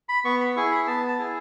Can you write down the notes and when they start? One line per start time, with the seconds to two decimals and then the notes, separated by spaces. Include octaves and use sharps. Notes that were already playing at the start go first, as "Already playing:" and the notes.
0.09 B5
0.25 B3 C#6
0.41 B5
0.56 E4 G#4 C#6
0.71 B5
0.87 B3 A5
1.08 A5
1.19 E4 G#4